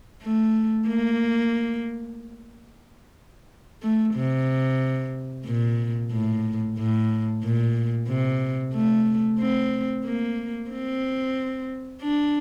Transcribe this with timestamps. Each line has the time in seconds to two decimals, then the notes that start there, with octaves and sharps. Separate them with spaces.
0.23 A3
0.87 A#3
3.82 A3
4.15 C3
5.46 A#2
6.12 A2
6.78 A2
7.43 A#2
8.08 C3
8.74 A3
9.39 C4
10.05 A#3
10.70 C4
12.02 D4